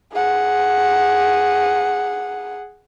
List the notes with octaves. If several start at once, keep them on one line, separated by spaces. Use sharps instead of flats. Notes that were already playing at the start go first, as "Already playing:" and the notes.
G#4 F#5